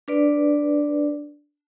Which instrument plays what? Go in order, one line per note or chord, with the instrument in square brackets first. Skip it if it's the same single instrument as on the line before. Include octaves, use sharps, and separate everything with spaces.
[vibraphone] D4 B4 D5